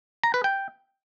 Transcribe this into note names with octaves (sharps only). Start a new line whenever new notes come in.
A#5
B4
G5